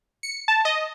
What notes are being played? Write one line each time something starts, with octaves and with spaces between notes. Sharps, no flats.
C#7
A5
D#5